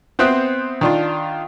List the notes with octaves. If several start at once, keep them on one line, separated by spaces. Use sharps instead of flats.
B3 C4 C5 E5 D#6 F#6
D#3 D4 F4